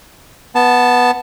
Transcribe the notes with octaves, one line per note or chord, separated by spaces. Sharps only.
B3 A5